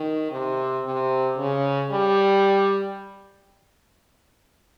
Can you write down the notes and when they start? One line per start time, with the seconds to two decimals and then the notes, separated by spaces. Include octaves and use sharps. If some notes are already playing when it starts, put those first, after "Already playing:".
Already playing: D#3
0.31 C3
0.85 C3
1.38 C#3
1.91 G3